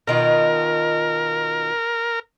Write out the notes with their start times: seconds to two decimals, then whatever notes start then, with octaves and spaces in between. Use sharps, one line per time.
0.07 B2 D#3 F4 A#4